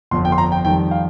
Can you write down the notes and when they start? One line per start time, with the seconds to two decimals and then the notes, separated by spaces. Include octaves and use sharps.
0.11 G1 F2 F3 C6
0.25 G5
0.32 C6
0.38 A#5
0.52 G5
0.65 F2 D#3 G3 G5
0.91 F5